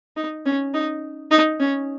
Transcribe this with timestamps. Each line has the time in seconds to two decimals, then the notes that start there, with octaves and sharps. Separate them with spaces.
0.17 D#4
0.46 C#4
0.74 D#4
1.31 D#4
1.60 C#4